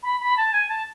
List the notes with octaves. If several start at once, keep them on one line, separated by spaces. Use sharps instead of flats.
B5
B5
A5
G#5
A5